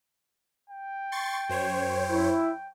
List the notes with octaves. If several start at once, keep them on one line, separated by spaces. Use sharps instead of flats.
G5
C6 C#6 A6
F#2 C5 C#5
E4